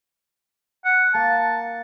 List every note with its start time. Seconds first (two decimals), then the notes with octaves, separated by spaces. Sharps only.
0.85 F#5
1.14 A#3 A5